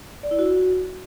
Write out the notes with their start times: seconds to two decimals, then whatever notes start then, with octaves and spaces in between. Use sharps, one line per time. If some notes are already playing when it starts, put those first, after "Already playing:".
0.23 D5
0.31 E4
0.39 F#4